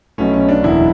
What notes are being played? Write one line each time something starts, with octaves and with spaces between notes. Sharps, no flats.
B1 B2 A3 C#4
C#4
D4
F#1 E2 B2 F#3 E4